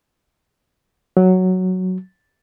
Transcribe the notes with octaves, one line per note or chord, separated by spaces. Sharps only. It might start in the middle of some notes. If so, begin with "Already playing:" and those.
F#3